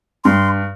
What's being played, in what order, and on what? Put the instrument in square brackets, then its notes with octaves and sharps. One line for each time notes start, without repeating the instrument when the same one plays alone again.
[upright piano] G2 [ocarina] C6